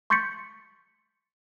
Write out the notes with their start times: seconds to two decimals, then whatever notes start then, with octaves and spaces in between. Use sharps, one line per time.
0.10 C6 C#6 G6 A6 B6 C#7